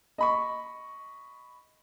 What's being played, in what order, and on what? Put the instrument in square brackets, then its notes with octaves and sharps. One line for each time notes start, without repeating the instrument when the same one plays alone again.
[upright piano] D#5 B5 C#6